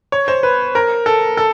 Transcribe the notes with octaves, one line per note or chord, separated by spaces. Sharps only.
C#5
C5
B4
A#4
A4
A4